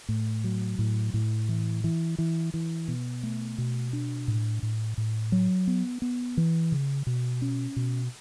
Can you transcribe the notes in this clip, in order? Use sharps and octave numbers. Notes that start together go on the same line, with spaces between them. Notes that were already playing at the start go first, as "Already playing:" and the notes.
A2
F#3
A2
A2
E3
E3
E3
E3
B2
A3
B2
D4
A2
A2
A2
F#3
B3
B3
E3
C#3
B2
C#4
B2